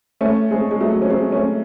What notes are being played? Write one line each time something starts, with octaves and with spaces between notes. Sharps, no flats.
A3 C#4
G#3 C4
G#3
F#3 A3
C#4
G#3 C4
A3 C#4